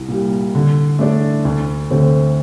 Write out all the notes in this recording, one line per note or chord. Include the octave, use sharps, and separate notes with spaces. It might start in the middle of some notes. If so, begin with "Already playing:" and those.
Already playing: C2
A#2 G3
D3
A3 D4 A4 D5
D2
D3 A3 C4